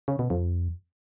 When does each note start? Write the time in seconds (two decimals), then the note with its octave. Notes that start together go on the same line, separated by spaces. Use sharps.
0.08 C#3
0.19 B2
0.30 F2